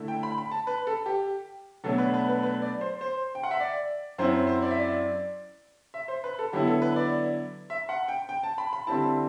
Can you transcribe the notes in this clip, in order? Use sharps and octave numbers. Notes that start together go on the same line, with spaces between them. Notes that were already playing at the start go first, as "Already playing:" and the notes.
Already playing: D3 A3 E4
G5
B5
B5
A5
B4
A4
G4
B2 F#3 A3 D4 A4
B4
B4
B4
B4
D5
C5
C5
G5
F#5
E5
D5
F#2 F#3 C4 E4 C5
C5
D5
E5
D5
E5
C5
B4
A4
D3 F#3 B3 E4 G4
A4
B4
D5
E5
F#5
G5
G5
A5
B5
B5
D3 G3 C4 E4 A5